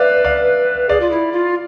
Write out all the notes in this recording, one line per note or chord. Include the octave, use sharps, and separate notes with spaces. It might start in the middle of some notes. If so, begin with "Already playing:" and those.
Already playing: B4 D5 E5 F5
D5 F5
G#4 D5 F5
F4
E4
F4